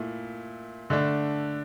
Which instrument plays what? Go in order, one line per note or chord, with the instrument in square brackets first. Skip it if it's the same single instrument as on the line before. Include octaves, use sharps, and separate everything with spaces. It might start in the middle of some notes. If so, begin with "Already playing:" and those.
Already playing: [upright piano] A#2 A3 E4
D3 A3 D4